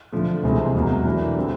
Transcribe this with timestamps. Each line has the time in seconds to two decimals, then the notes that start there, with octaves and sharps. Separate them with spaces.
0.12 D3 F3 A3
0.43 C2 C3 E3 G#3 C4
0.75 E2 B2 F#3 A#3
1.05 E3 A3 D4 F#4 A#4
1.37 D3 G3 C4 E4